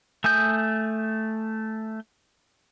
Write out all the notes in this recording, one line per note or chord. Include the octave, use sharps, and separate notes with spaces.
A3 G#5 D#6 G6